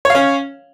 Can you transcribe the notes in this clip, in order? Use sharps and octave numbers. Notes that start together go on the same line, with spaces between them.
C#4 C#5 F5